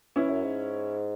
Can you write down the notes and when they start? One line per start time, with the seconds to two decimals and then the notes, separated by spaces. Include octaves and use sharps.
0.16 E3 C#4 E4
0.30 F#2
0.44 G#2